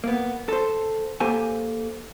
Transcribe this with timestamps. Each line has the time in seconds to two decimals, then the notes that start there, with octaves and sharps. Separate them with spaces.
0.04 A#3 B3
0.49 A4 C5
1.20 A#3 G4 A4 C5 G#5